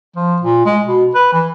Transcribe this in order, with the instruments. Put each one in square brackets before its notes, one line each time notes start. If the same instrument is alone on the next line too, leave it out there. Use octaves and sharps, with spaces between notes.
[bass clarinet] F3
A#2
G#3
B2
B4
E3